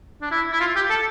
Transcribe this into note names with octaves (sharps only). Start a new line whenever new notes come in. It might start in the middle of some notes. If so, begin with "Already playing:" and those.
D4
E4
E4
F4
G4
A4